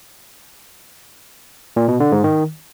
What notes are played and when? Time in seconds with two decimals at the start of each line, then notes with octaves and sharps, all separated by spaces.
1.76 A#2
1.88 B2
2.00 D3
2.12 G#2
2.24 D#3